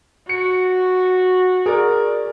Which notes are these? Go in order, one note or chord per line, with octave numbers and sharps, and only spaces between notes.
F#4 C#7
G#4 A#4 D5